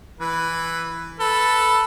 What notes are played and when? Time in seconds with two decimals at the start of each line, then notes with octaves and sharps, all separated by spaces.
0.20 E3 B4
1.20 A4 B4